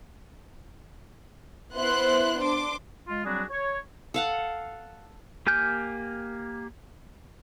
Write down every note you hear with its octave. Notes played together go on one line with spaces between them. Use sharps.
B3 E4 C5 C6 F#6
D4 C6 D6
G#3 F4
F#3 G3 C4 D4 F#4 G#4
C#5
A4 F5 F#5
A#3 G4 G#5 F6 G6